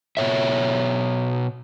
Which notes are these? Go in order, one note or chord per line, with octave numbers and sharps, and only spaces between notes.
B2 C#5 E5